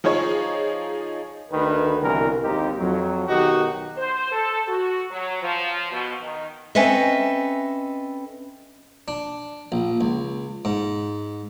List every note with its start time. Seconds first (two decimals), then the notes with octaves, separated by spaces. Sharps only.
0.04 F3 D#4 G#4 C#5
1.52 D2 D3 D#3 B4
2.01 C2 B2 D3 E3 A#4
2.42 G#1 D#2 C4 D#4 G4
2.77 F2 F#3
3.28 B1 D#3 D#4 F#4 G4
3.97 C5
4.32 A4
4.68 F#4
5.11 F#3
5.43 F3
5.92 B2
6.22 D#3
6.75 C4 C#4 A4 B4 D#5 E5
9.08 D4
9.72 A#1
10.01 C#2
10.65 G#2